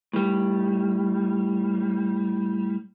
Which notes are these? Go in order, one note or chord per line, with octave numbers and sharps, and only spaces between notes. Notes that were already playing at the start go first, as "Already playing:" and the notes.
A2 G3